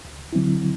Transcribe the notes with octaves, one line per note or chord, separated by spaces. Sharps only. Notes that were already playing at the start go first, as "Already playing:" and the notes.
D2
D3 F#3 C4 E4